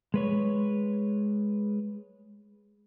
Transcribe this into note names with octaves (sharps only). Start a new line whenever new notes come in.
G#3 B4 C#5